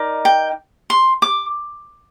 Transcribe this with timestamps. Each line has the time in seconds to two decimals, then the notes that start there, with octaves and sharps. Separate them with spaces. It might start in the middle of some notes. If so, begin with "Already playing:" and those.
Already playing: D#4 A#4 D5
0.25 G5
0.90 C6
1.22 D6